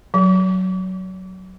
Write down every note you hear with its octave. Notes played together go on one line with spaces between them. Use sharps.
F#3